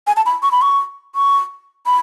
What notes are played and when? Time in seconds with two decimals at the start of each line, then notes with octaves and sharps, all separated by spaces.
0.07 G#5
0.16 A5
0.26 B5
0.43 C#6
0.52 B5
0.62 C#6
1.15 C#6
1.86 B5